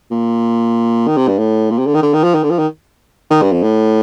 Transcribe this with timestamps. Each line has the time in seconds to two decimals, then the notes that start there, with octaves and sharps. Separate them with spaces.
0.11 A#2
1.07 D#3
1.17 C3
1.28 G2
1.38 A2
1.70 A#2
1.78 C3
1.87 D3
1.94 D#3
2.02 D3
2.13 D#3
2.23 F3
2.34 D#3
2.43 D3
2.50 F3
2.58 D#3
3.30 D#3
3.42 G2
3.51 F2
3.62 A2